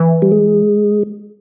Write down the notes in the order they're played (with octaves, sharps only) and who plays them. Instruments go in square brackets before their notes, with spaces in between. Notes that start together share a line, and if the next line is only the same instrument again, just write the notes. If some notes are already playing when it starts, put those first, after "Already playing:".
Already playing: [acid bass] E3
[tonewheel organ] G3
G#3